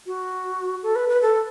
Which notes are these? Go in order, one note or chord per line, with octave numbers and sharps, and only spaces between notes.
F#4
A4
B4
B4
A4